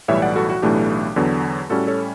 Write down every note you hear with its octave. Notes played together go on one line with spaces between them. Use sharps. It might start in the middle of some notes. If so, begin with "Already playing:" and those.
B1 A2 E3 G3 C#5 E5
D5 F#5
F#4 A4
F#4
B1 A2 E3 A3 D4 G4
E2 D3 F#3 B3
A2 G3 C#4 F#4 A4
A4 C#5